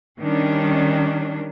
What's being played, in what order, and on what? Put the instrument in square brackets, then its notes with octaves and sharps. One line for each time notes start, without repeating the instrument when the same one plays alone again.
[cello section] D#3 G3 C#4 D4